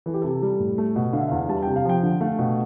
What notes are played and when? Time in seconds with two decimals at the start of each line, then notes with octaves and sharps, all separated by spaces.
0.06 E3 A4
0.14 G4
0.22 C3 A4
0.42 G3
0.60 A2
0.78 A3
0.96 B2
1.13 D3 F5
1.21 E5
1.28 E2 F5
1.49 G3 A5
1.63 C3 G5
1.76 F5
1.85 F3 G5
2.03 D3
2.21 A3 F5
2.39 B2